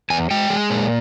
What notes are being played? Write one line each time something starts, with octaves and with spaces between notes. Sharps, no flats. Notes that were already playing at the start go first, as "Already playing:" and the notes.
E2 G#5
G#3 G5
G#3
A#2